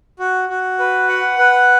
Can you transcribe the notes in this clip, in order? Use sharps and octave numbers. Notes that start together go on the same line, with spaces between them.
F#4
F#4
B4
F#5
B4